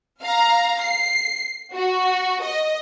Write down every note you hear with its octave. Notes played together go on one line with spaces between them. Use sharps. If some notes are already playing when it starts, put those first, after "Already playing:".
F5 A#5
C7
F#4
D#5